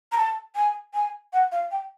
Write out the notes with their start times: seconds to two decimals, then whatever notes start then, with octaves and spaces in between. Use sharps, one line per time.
0.12 A#5
0.17 A5
0.56 G#5
0.94 G#5
1.33 F#5
1.52 F5
1.71 G5